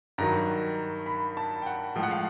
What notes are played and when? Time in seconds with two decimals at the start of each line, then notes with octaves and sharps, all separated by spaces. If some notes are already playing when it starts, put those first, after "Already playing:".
0.18 G2 D#3 F#3 A#5
1.06 B5
1.37 A5
1.62 G5
1.66 F#5
1.95 A2 F3 G#3 G5
2.03 F#5
2.11 F5